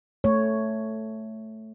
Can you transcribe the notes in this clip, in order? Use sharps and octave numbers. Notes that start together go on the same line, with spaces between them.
A3 C#5